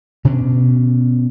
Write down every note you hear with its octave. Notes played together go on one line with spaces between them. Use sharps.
B2 C#4 D4